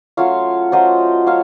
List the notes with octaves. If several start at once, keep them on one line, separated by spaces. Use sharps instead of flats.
F#3 A3 C#4 F4 C#5 F5
F#3 A3 C#4 F4 C5 D#5
F#3 A3 C#4 F4 C#5 F5